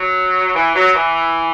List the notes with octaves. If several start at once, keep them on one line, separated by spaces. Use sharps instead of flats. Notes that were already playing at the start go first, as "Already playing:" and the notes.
Already playing: F#3
E3
F#3
E3